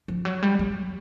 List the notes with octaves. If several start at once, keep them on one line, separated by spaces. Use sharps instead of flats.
F3
F#3
G3
F#3